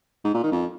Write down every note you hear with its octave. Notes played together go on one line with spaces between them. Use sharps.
G#2
A#2
D#3
F2